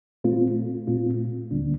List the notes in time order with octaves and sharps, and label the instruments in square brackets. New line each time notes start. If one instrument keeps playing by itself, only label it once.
[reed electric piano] A#2 A3 C4 F4
A#2 A3 C4 F4
D2 D3 G3 A#3 D4